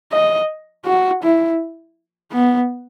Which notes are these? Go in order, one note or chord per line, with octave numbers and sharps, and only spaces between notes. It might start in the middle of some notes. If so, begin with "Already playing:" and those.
D#5
F#4
E4
B3